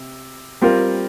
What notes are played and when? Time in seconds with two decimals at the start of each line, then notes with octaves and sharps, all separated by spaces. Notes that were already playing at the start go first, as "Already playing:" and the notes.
Already playing: C3
0.62 G3 C4 F4 A#4